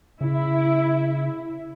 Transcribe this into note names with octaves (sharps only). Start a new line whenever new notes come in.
C#3 E4